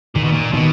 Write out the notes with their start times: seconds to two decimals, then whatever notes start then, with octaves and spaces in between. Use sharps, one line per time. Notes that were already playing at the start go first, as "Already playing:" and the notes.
0.15 A#2 D#3
0.24 B2
0.32 A#2
0.53 B2 D#3